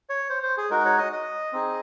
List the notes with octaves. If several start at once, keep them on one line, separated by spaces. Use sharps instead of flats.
C#5
C5
C5
G#4
G#3 D#4 F#4 A#4
C#5
D#5
D#5
C4 D#4 G#4